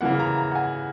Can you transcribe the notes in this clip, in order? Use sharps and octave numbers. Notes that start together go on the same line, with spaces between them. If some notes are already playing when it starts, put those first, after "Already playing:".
C#3 E3 A#3 F#5
A#5
A#5
F#5
G#5